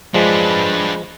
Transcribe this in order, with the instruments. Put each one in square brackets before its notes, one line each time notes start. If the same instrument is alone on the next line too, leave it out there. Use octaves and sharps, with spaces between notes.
[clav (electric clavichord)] F3 G#3 [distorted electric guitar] D4 B4